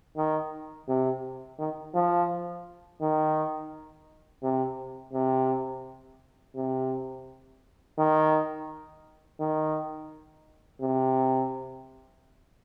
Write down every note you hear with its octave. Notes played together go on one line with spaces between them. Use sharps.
D#3
C3
D#3
F3
D#3
C3
C3
C3
D#3
D#3
C3